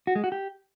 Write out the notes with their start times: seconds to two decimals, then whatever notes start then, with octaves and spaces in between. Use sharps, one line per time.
0.07 F#4
0.15 G#3
0.24 F#4
0.32 G4